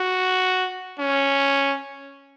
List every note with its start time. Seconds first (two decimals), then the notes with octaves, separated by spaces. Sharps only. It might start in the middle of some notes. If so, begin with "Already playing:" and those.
Already playing: F#4
0.99 C#4